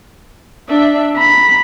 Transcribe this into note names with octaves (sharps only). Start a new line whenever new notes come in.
D4 E5
A#5 B5